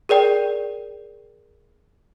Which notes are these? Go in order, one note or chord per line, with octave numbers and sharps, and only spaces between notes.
G#4 A#4 D5 G5